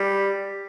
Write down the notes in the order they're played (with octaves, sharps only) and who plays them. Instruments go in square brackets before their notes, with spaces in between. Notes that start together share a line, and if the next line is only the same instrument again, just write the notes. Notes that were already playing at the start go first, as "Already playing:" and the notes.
Already playing: [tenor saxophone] G3